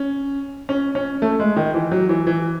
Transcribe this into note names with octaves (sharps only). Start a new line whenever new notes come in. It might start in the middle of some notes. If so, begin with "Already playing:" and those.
Already playing: C#4
C#4
C#4
A3
G#3
D#3
E3
F#3
E3
E3